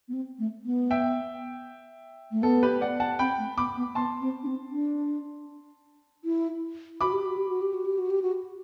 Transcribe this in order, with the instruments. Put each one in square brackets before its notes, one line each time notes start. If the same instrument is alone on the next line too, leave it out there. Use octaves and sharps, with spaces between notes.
[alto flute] B3
C4
A3
B3
[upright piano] E5 G5
[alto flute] A3
[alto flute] B3 [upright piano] A4
[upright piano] G4 B4
D5 F#5
F#5 A5
[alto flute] C4 [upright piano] G5 B5
[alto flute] A3
[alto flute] B3 [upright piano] B5 D6
[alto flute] B3
[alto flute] B3 [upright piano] A5 C6
[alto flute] C4
D4
C4
D4
E4
[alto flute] F#4 [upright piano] B5 D6
[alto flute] G4
F#4
G4
F#4
G4
F#4
G4
F#4
G4
F#4